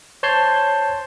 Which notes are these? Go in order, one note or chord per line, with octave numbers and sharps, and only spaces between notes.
C5 C#5 A5 C6 G6 C7